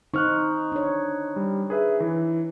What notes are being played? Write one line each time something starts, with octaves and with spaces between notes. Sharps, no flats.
D#4 C5 C#6 F6 F#6
D4 C#5
G3
G#4 B4 E5
E3